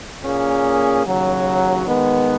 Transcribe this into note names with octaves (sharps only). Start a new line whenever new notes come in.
A#2 A#3 C#4 G#4
D#2 C#3 F#3
D#3 G#3 B3